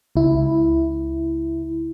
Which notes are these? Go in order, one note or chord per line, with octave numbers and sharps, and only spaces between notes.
C#2 E4